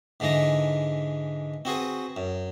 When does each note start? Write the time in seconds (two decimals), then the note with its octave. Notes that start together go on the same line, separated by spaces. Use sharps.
0.20 G#2 D3 E3 G#3 A#5
1.65 C4 F#4 G#4 B4
2.17 F#2